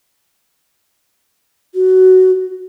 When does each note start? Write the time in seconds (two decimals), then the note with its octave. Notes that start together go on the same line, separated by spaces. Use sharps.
1.75 F#4